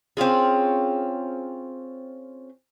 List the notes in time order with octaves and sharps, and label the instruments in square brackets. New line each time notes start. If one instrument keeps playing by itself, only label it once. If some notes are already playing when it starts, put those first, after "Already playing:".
[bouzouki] C4 C#4 F4 G#4